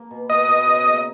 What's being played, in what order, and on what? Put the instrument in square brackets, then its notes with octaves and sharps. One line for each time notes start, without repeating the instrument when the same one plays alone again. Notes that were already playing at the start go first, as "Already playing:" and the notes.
Already playing: [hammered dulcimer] A#3
B2
[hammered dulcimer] B2 [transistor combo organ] D#5
[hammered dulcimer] B2
C#3
A#3